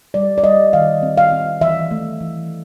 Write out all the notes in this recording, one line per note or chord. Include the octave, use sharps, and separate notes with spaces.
G3 D5
D5
G3 D#5
D#3 F5
C4
F5
C4
E3 E5
A3
E3